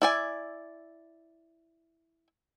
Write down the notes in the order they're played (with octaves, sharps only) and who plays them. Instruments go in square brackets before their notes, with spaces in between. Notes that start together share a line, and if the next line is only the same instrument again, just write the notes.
[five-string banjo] E4 D5 G#5